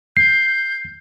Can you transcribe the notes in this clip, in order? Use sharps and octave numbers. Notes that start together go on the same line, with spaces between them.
G6 C7